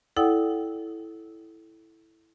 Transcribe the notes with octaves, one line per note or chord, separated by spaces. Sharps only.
E4 A4 D5 F#5 G5 D#6